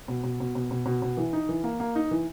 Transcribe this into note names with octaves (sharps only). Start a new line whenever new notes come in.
B2
B2
B2
B2
B2
B2
B2
E3
D#4
E3
A#3
A#3
D#4
E3